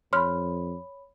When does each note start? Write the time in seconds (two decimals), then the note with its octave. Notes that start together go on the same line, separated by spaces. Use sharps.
0.13 F2 C#5 B5 C6 F6